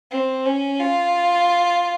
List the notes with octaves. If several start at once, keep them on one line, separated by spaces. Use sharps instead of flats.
C4
C#4
F4